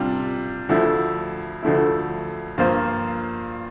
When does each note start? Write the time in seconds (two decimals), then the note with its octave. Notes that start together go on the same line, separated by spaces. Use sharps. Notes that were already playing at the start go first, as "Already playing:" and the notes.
Already playing: C3 G3 D4 F4
0.69 D2 D3 F3 A3 E4
1.63 D2 D3 F3 A3 E4
2.58 G2 F3 A#3 F4 C5